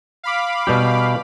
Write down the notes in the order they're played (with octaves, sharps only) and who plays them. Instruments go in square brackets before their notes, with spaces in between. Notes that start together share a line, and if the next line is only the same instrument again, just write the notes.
[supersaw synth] F5 B5 D6
[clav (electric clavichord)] B2 G3 G4